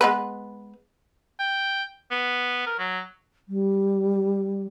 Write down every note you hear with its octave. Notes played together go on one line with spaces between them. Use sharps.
G#3 B3 B4
G5
B3
A#4
F#3
G3